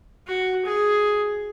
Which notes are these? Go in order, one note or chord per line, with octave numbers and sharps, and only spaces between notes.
F#4
G#4